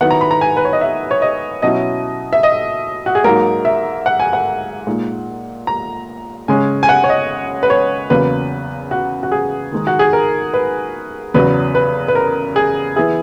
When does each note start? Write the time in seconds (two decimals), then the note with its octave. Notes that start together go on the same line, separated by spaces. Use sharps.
0.01 D#3 F#3 B3 E4 F#5
0.11 A#5
0.21 B5
0.31 A#5
0.41 G#5
0.57 B4
0.65 C#5
0.73 D#5
0.81 E5
1.11 C#5
1.22 D#5
1.62 B2 F#3 C#4 E4 D#5
2.33 E5
2.43 D#5
3.06 F#4
3.15 G#4
3.24 G#2 F#3 A#3 D#4 A#4
3.65 E5
4.06 F#5
4.20 G#5
4.33 F#5
4.86 A#2 G#3 D#4
5.67 A#5
6.48 C#3 G#3 C#4 G#5
6.83 G#5
6.89 F#5
7.04 C#5
7.09 D#5
7.63 B4
7.70 C#5
8.10 E2 C#3 F#3 A#3 B4
8.91 F#4
9.23 F#4
9.32 G#4
9.72 D#3 G#3 D#4
9.87 F#4
9.99 G#4
10.13 A#4
10.54 B4
11.34 E2 C#3 F#3 B4
11.75 B4
12.08 B4
12.15 A#4
12.56 G#4
12.96 E3 B3 E4 G#4